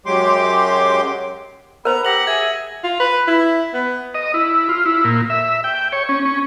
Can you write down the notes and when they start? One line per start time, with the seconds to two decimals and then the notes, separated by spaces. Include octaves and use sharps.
0.06 F#2 F#3 G#3 G4 C6 D6
1.85 B3 A#4 C5 A#5
2.05 G4 F#5 E6 A#6 F#7
2.27 G#4 E5 G#6
2.84 F4
3.00 B4
3.28 E4
3.74 B3
4.15 D#5
4.34 E4
4.69 F4
4.85 E4
5.04 A#2
5.30 E5
5.64 G5
5.92 C#5
6.09 C#4
6.25 C#4